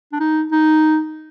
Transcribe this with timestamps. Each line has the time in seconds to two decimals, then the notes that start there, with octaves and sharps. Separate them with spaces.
0.12 D4
0.20 D#4
0.52 D#4